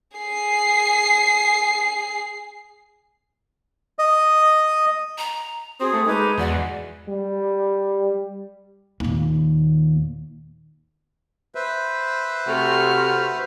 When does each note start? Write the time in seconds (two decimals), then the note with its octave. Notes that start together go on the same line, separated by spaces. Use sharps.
0.18 G#4 C7
3.99 D#5
5.18 A#5
5.80 C4 F#4 G#4 D#6
5.93 A3
6.06 G#3 D#4 B4 D6 G#6
6.38 E2 F#4 D5
7.08 G3
9.00 D#2 A#2
11.55 B4 C5 E5
12.48 C3 A3 F#4 F6